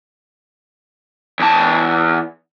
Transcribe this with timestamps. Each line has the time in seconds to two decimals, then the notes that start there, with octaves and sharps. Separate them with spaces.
1.40 E2 A5